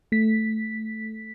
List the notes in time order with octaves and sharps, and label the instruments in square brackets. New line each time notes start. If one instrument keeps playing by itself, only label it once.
[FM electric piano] A3 B6